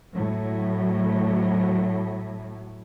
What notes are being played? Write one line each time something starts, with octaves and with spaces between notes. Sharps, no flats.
A2 F#3